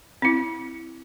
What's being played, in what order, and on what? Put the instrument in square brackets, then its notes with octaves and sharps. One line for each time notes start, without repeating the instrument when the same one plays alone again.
[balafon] C4 E4